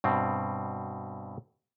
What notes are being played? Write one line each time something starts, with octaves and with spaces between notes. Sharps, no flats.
G2 B2 C4